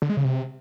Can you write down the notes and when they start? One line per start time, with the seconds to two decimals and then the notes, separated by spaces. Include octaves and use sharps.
0.02 D3
0.09 G#3
0.17 C#3
0.25 C3